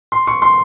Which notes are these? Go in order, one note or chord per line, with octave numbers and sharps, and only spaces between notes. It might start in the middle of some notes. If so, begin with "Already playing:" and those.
C6
C#6
C6